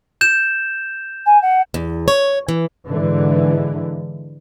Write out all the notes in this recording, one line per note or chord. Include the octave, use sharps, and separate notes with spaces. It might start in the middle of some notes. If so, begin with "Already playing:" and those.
G6 E7
G#5
F#5
E2
C#5
E3
G#2 D3 E3 G#3